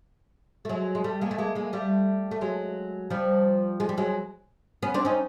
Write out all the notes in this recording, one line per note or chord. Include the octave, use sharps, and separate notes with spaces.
A3
F#3 G#3
G#3
G3 A3
G#3 A#3
A3
G#3 A#3
G#3 A#3
G3 A3
A3
F#3 G#3
F3 G3
G#3
G3
F#3 G#3
B3 C#4
C4 D4
C#4 D#4